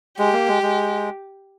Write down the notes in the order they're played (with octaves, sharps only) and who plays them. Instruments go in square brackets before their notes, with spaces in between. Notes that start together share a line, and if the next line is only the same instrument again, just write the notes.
[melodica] G#3 [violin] G4
[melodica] A#3
G#3
G#3